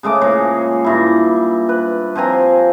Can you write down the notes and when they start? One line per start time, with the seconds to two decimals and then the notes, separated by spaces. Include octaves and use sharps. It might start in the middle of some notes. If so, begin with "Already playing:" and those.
0.03 C#3 G#3 A3 D6
0.21 A#2 G#3 C#5
0.84 G2 E4
1.69 B4
2.16 F3 C4 G#5 A#5